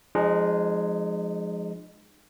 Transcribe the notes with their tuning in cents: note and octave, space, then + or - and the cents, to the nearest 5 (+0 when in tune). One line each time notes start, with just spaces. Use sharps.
F3 +0 G#3 +0 D#4 -45